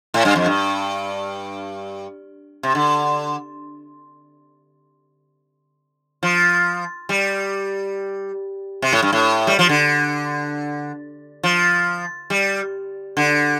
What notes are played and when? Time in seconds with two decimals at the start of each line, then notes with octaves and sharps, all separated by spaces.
0.14 A2
0.25 G2
0.36 F2
0.46 G2
2.63 C3
2.75 D3
6.23 F3
7.09 G3
8.82 C3
8.93 A2
9.02 G2
9.13 A2
9.47 G3
9.59 F3
9.69 D3
11.43 F3
12.30 G3
13.17 D3